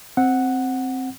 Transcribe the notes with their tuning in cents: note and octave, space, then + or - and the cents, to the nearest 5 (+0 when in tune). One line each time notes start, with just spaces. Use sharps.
C4 +0 F#5 +0